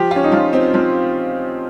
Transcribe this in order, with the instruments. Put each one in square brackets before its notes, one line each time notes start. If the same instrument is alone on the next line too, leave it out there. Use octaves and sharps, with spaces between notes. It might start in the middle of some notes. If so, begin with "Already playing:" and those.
Already playing: [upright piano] F3 [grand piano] G4
[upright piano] F4
[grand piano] C#4
D#4
[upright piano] F3 [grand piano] F4
[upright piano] C4 [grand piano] D#4
[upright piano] F3 [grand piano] C4